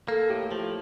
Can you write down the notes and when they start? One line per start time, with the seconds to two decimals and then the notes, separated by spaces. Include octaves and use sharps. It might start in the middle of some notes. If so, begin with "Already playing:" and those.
0.08 A#3 A4
0.30 A2 G4
0.51 F3